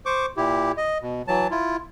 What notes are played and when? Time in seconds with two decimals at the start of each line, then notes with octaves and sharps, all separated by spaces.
0.06 C5 C#6 D6
0.37 A#2 E4 G4
0.77 D#5
1.02 B2
1.28 E3 F#3 A5
1.51 E4 F4